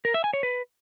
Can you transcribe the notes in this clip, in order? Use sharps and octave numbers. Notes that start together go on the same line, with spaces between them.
A#4
E5
G#5
C#5
B4